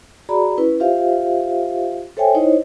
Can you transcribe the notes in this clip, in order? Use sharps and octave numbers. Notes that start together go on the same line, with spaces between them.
F#4 G#4 D5 A#5 B5
C#4 E4 B4
F4 G4 C5 E5 F5
A4 C5 C#5 E5 G5 G#5
D#4 E4 C5 C#5 D#5